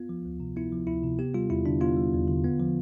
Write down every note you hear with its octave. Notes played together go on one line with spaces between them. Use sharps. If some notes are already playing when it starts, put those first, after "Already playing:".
Already playing: B3 F4
F3
D2
C3
B3 E4
F3
D2 E4
C3
B3 G4
G3 F4
E2 E4
D3 D4
B3 F4
G3
E2
D3
B3
F3